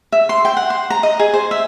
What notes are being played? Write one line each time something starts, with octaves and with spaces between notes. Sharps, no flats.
E5
C6
G5
F#5
C6
A#5
D#5
G#4
C5
E5